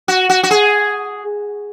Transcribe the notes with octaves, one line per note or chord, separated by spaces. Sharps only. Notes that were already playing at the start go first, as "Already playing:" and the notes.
F#4
F#4
F#4
G#4